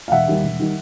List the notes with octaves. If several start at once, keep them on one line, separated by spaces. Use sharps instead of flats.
F5
E1 E5 F#5
D#2 D#3 G3
E1
D#3 G3